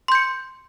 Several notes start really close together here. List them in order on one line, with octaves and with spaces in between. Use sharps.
C6 G6 C#7